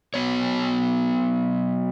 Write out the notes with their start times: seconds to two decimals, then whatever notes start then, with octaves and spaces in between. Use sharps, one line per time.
0.14 F#3 B3 C#5